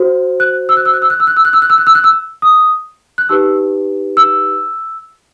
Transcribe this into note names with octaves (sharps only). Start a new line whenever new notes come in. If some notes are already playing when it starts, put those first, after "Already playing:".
Already playing: F#4 C5
F#6
E6
F#6
E6
F#6
E6
F#6
E6
F#6
E6
F#6
E6
F#6
E6
F#6
E6
F#6
E6
D#6
F#6
D#4 G4 B4 E6
E6